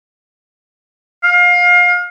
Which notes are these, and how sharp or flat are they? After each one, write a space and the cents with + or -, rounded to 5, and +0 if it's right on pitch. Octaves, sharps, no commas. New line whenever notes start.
F5 +25